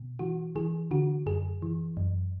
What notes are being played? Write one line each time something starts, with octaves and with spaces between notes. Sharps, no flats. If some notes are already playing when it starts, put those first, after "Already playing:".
Already playing: B2
E3 F#4
E3 G#4
D3 F#4
F#2 G#4
E3
F#2